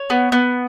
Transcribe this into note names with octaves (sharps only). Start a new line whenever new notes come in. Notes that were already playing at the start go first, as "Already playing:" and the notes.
Already playing: C#5
B3
B3